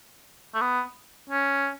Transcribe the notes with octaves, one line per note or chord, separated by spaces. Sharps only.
A3
B3
C#4